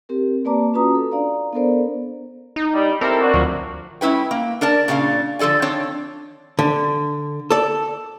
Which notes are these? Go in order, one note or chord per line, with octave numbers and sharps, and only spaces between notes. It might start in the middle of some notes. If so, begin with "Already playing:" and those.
C4 G4 A#4
A#3 B4 D5 A5 A#5 D6
C#4 F4 F#4 B4 A#5 D#6
A4
D4 D5 F5 A#5
B3 D4 A4 A#4 C5 D5
D#4
G3
C4 E4 G4 A4 A#4
D4 F#4
D2 F3 F#3
G#3 C#4 E4 B4 G5
A#3
D4 A#4 D5 A5
A#2 C#3 D4 F5
D3 F3 A4 D5 G#5
D#3 C4 D4 C#5
D3
A4 D5